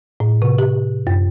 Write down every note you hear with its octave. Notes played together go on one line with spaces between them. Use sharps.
A2
C3
G4
F#2